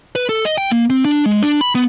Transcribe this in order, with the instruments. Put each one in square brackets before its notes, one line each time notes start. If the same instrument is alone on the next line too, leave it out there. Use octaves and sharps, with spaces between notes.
[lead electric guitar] B4
A4
D#5
G5
A#3
C4
D4
G#3
D4
B5
B3